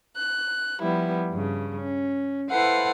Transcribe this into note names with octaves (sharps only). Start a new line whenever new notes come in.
F#6
F3 G3 B3 E4
G2 C#3
C#4
E4 A4 B4 C5 F5 F#5